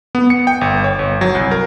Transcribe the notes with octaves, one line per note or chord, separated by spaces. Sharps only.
B3
C#7
G5
G1
C#5
G1
F#3
C2
A#4